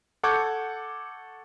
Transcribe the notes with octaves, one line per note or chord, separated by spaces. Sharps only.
A4 F#5 C#6 D6 G6 G#6